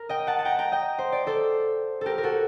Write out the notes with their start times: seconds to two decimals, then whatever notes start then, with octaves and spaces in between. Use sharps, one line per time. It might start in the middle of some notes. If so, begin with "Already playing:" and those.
Already playing: A#4
0.09 D#5 G5
0.27 F#5 A5
0.39 A5
0.45 G5 A#5
0.59 G5 A#5
0.72 D#5 G5
0.98 C5
1.12 D5
1.27 A4 C5
2.01 G4 A4 A#4
2.18 A#4
2.23 F#4 A4